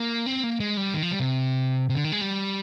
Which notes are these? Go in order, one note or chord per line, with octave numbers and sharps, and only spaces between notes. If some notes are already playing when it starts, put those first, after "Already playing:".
Already playing: A#3
C4
A#3
G#3
G3
D#3
F3
G3
C3
C3
D3
D#3
G#3
G3